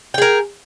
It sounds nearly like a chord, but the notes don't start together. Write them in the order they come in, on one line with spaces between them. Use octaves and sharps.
G5 G#4 A#4